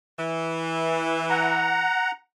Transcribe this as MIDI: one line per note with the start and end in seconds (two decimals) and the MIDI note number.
0.19 1.89 52
1.30 2.11 78
1.30 2.11 82